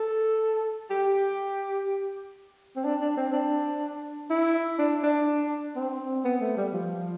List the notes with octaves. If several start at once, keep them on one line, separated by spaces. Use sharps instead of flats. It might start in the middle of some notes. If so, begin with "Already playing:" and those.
Already playing: A4
G4
C4
D4
D4
C4
D4
E4
D4
D4
C4
B3
A3
G3
F3